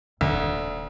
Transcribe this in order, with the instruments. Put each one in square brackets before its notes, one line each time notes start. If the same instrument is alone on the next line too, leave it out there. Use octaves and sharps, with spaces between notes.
[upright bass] D#1 [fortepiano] D2